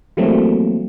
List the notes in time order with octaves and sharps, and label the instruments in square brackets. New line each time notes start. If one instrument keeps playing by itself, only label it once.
[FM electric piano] E3 F#3 G3 A3 A#3 C4